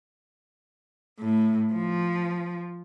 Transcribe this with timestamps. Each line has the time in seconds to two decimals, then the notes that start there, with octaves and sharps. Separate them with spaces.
1.20 A2
1.73 F3